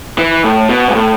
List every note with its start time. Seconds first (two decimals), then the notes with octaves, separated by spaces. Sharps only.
0.18 E3
0.44 A2
0.69 B2
0.88 G#2
0.95 A2